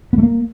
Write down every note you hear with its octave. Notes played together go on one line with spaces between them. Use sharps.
B3
A3
A#3